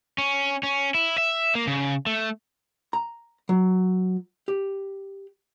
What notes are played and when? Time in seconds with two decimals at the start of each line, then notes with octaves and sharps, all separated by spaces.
0.18 C#4
0.63 C#4
0.94 E4
1.18 E5
1.55 A#3
1.67 C#3
2.06 A3
2.93 A#5
3.49 F#3
4.48 G4